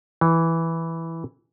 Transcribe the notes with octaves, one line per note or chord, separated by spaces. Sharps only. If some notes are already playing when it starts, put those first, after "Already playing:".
E3